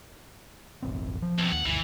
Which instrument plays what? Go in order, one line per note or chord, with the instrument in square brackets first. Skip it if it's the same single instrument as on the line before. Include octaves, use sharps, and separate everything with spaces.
[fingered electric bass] F1 A#1 C4
F3
[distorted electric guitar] B1 C3
[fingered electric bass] D#2 [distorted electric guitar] F#5
[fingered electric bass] G1 D2 [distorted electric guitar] E3